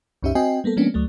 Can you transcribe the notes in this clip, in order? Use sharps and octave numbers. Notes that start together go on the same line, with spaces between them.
C2 F#2 C#4 D#4 G4 E5
C4 F#4 D#5 G5 G#5
G3 A#3 B3 A4
F3 G#3 A#3 B3 C#4 D4
D2 F#3 A3